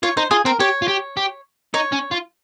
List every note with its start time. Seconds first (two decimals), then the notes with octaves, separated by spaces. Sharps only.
0.03 F4 C#5
0.17 D#4 C5
0.31 F4 G#4
0.45 C4 A#4
0.59 G4 C#5
0.82 F4
0.88 G4
1.17 G4
1.74 D#4 C#5
1.92 C#4
2.11 F4